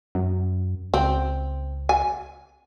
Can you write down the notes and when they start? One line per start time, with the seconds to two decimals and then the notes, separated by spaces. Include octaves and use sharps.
0.15 F#2
0.94 C#2 C4
1.89 G#5